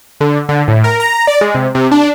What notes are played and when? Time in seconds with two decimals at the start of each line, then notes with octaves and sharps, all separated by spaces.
0.20 D3
0.49 D3
0.68 A2
0.84 A#4
1.00 A#5
1.27 D5
1.41 G#3
1.55 C3
1.75 C3
1.91 D4